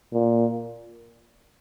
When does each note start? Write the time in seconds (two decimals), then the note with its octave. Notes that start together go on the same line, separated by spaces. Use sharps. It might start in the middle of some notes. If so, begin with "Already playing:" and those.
0.13 A#2